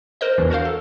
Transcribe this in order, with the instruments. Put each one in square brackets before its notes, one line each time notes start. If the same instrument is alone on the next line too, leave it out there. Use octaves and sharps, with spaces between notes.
[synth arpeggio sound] A#4 C5 D#5
E2 E3 D4
F#4 A#4 C5 F5
A4